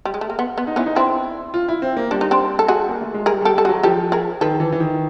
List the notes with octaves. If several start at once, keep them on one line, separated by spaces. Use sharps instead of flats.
G3
G#3
A3
A#3
B3
B3
D#4
B3 C#4 E4
D#4
C4 D4 E4
F4
E4
C4
A#3
G3 D4
D#4
C4 D4
A4
F#4 G#4
A#3
A3
G#3
G3 G#4 A#4
G3 G4 A4
G3 A4
F#4 G#4
F#3
F3 G4 A4
G#4 A#4
D#3 A4 B4
E3
E3
D#3